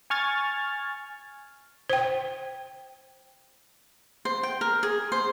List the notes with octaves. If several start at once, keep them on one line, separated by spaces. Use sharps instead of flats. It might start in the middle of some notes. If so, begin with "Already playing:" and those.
G#5 C#6 F6 G#6 A6
C5 G5
C5
G5
A#4
G#4
C5